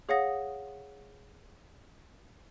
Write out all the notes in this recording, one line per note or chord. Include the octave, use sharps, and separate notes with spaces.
G#4 C#5 F5 F#5 D#6 A#6